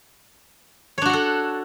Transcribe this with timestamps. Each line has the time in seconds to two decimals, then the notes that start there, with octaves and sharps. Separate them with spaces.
0.98 C#5
1.02 D4
1.06 F#4
1.09 F#5
1.13 A4